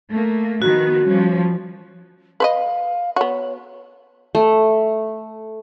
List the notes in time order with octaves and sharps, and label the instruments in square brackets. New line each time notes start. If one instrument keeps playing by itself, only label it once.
[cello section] A3 A#3
[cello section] D#3 F3 B3 [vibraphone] F#4
[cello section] F3 G3 C#4
[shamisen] B4 C5 D#5 [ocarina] F5
[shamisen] B3 F#4 [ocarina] C#5
[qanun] A3